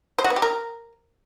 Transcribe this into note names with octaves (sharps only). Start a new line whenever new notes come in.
C5
F#4
B3
G4
A#4